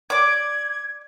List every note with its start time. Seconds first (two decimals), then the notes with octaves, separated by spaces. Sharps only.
0.10 D5 D6 G#6